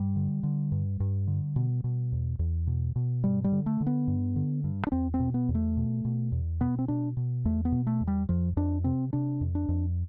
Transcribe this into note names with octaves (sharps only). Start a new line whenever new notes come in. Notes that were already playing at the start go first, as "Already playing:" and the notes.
Already playing: G2 G3
D3
D3
G2
G2
D3
B2
B2
E2
E2
B2
B2
G2 G3
G3
D3
A3
D3
B3
G2
D3
G2
D4
E2 C4
C4
B2
B3
E2
A3
B2
B2
E2
B2 B3
C4
B2 D4
B2
E2 A3
B3
B2
A3
E2
G3
F2 F3
F2 D4
C3 C4
C3 D4
F2
D4
F2